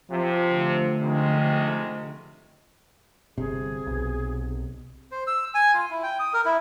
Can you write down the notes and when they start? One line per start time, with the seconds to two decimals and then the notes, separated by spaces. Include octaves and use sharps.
0.11 C3 F3
0.52 D3 A3
1.03 C3 D#3 F3 G#3
3.38 G1 C3 G#4
3.86 B1
5.11 C5
5.27 E6
5.55 G#5
5.74 F4
5.90 E4
6.03 G5
6.19 D#6
6.33 A#4
6.45 E4